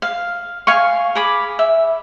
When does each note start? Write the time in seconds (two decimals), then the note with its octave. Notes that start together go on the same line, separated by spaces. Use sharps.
0.02 F5
0.67 F5 G#5 C#6
1.15 G#4 B5 D6
1.59 E5